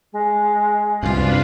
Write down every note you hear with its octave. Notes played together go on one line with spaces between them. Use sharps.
G#3
C2 F#2 C3 D4 F4 B4